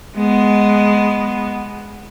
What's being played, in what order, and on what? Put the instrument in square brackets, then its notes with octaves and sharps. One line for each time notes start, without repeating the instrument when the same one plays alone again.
[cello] G#3 B3